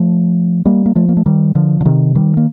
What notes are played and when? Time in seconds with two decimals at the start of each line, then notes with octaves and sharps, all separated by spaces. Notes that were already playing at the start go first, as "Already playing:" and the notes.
Already playing: F3 A3
0.65 G3 A#3
0.86 A#3
0.95 F3 A3
1.09 A#3
1.17 A3
1.26 D#3 G3
1.55 D3 F3
1.81 D3
1.85 C3 D#3
2.15 D#3 G3
2.37 A#3